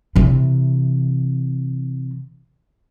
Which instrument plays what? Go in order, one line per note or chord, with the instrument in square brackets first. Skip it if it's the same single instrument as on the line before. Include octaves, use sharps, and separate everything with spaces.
[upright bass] C3 E3